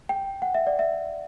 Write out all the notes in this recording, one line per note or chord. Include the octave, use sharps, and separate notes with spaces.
G5
F#5
E5
D5
E5